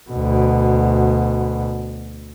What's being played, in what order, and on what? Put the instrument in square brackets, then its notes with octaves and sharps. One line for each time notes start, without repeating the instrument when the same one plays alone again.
[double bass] D2 B2